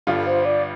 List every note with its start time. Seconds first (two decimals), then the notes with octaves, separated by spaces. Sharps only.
0.07 G1 G2 G3 F4 A4
0.27 C5
0.45 D5